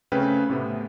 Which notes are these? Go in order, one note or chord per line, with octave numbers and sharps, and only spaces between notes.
C#3 A3 C4 C#4 B4 G5
A2 C3 B3